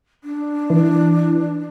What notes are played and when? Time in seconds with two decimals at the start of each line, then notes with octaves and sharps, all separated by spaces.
0.24 D4
0.70 E3